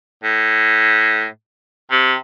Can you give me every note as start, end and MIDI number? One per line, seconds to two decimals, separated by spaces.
0.24 1.26 45
1.91 2.16 48